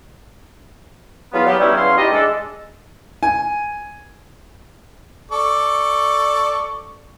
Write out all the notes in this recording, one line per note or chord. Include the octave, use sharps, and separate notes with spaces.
E2 F#3 B3 F4 B4 F5
F#3 B3 G4
E3 G3 B3 C#4 D#4 E4
E2 F#3 C#4 F5 C6
E3 D#4 G4 B4 D5 D#5
G#3 D4 A4
G#5
A4 D5 C#6